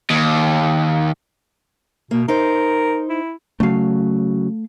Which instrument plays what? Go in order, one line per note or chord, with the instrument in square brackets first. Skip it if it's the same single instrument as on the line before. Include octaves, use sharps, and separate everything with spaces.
[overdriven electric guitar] D#2
[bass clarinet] B2 [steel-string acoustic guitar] A#3
[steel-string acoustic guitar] D#4 C5 [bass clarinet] A#4
[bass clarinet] E4
[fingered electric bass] C#3 F#3 [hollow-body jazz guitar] A3 F5